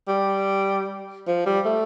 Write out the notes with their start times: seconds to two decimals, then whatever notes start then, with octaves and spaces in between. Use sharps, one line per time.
0.08 G3
1.27 F3
1.46 G3
1.66 A3